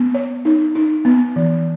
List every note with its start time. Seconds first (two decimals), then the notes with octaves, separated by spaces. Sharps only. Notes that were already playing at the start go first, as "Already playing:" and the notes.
Already playing: B3
0.15 C#5
0.45 D#4
0.75 D#4
1.05 B3
1.36 E3